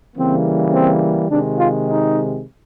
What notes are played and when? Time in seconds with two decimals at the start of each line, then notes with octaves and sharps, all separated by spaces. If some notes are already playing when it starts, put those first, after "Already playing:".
0.15 C#3 E3 G3 A#3 C4
0.72 C4
1.29 C3 D#3 G#3 D4
1.57 F4
1.86 D#4